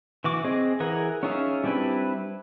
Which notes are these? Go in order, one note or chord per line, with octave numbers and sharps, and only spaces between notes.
E3 F#4 D6
C4 G#4 D#5
E3 G#4 A#4 F#5
C#4 D#4 F4 G#4 E5
G3 C4 D4 E4 B4